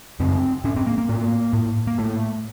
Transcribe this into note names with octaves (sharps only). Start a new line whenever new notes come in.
F#2 C#3 C4
A2 C#4
C4
A#3
A#3
A2
A2
A#3
A2 A3